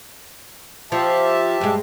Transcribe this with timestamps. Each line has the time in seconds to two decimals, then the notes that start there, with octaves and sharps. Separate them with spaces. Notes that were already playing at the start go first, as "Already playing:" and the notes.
0.92 F3 G4 E5 A5
1.61 G2 G#3